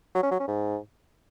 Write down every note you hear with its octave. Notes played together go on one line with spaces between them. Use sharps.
F#3
C#4
F#3
C#4
G#2